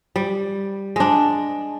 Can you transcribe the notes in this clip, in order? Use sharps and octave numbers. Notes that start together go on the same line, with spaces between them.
G3
G#3 D4